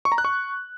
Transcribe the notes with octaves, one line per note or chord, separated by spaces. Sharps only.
C#6
A#5
F#6
C#6